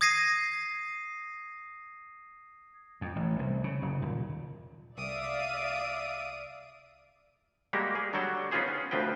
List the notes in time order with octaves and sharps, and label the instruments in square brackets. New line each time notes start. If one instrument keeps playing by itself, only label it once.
[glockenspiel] D#6 G#6 A#6 C7 D#7
[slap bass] F2
A1
C2
C#3
F#1
D#1
[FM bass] C2 [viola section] D5 E5 F5 [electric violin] D#6 D7
[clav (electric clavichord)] G3 G#3 A#3 F#4 G4
G#4
D3 F#3 G3 F#4 G5 A5
B3 C#4 D#4 F4 G#4 C5
C#4
D2 F3 C4 B4 G5